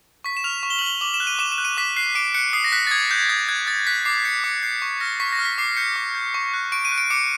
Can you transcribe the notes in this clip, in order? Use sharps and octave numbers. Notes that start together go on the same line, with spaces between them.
C#6 B6
E7
F6 F7
C#6
G7
F#7
F6 G7
D6 F#7
E7
F#6
D#7
D6 E7
E7
F#6
D#7
D6 B6
F#6 C7
D6 D7
F#6 C#7
D#6 C7
A#6
F#6 B6
A6
D#6 G#6
F#6 G6
D#6 G#6
F#6 G#6
D#6 A6
F#6 B6
D6 C7
G6 C#7
D6 C#7
G6 C7
C#6
F6 A#6
C#6 B6
A#6
F6
B6
D6 C7
G6 C#7
D6
G6
C#6
F#6
C#6 D7
D#7
F#6
D7
D6 C#7